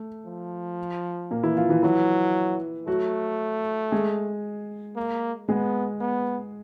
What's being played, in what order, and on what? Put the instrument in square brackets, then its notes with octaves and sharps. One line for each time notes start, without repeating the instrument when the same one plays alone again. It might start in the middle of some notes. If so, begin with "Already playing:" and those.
Already playing: [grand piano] A3
[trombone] F3
[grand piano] A#2 A#3
E3 E4
F3 F4
E3 E4
[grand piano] E3 E4 [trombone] F#3
[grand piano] F#3 F#4 [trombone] A3
[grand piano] G#3 G#4
[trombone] A#3
[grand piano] G#3 G#4 [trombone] B3
[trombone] B3